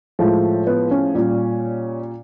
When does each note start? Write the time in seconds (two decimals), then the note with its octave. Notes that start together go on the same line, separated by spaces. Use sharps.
0.19 A2 F3 G#3 A3
0.67 B3
0.91 C#4
1.15 A#2 G3